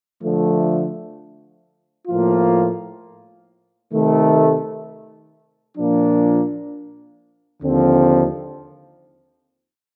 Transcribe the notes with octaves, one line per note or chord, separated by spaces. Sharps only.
D3 F3 A3
A2 F3 A#3 F4
C3 D#3 A3
A#2 F3 A#3 D4
D#2 D3 F3 C4